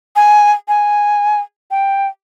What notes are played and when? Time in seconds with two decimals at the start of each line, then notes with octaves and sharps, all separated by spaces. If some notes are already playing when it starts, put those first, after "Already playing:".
0.16 G#5
0.68 G#5
1.71 G5